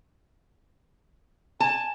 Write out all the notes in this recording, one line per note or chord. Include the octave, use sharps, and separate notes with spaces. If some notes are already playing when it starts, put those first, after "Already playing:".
G#5 A5